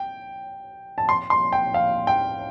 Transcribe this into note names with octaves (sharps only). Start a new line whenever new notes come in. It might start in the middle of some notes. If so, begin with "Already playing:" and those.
Already playing: G5
A5
C6
C6
G5
F5
G5